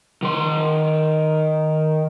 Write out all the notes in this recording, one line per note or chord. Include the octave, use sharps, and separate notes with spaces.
D#3 C6